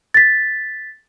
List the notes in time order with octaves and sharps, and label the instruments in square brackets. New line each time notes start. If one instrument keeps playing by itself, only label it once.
[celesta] A6 B6